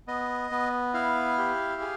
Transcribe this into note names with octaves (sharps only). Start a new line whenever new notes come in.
B3 D#5
B3
E4 F5
G4
G#4